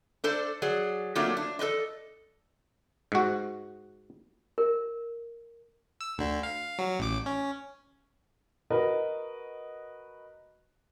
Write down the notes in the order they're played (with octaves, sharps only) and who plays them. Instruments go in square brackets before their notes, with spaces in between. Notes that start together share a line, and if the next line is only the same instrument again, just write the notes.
[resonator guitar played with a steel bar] D4 A4 C5 D5
F#3 G#4 D5
F#3 A3 A#3 C4 D4 F4
D4
A4 B4 D5 D#5
[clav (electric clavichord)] G#2 F#4
[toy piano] A#4
[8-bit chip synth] E6
D2 D3
F5
F#3
A1 D6
C#4
[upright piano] F#4 A#4 B4 D#5